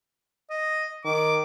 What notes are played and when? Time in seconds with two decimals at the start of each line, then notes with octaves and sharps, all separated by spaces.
0.50 D#5
1.05 D#3 D6